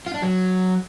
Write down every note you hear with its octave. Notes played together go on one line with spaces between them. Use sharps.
F4
D4
F#3